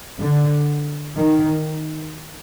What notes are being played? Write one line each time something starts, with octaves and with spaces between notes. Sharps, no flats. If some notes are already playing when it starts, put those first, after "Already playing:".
D3
D#3